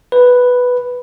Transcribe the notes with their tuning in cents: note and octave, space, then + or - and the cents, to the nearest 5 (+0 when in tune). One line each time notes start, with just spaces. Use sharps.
B4 +0